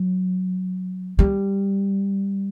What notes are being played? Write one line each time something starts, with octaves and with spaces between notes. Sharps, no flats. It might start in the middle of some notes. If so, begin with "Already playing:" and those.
Already playing: F#3
G3